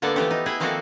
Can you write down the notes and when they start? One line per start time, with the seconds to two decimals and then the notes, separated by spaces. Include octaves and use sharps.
0.02 D3 A#3 B3 A4 D5
0.16 E3 F3 A3 B3 G4 A4
0.31 D#4
0.46 E4 G#4 B4 D#5
0.60 D#3 F3 A#3 C4 F#4 A4